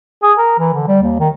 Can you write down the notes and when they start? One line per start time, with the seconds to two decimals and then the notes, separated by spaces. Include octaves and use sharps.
0.23 G#4
0.38 A#4
0.59 E3
0.74 D3
0.88 G3
1.02 D#2
1.20 D#3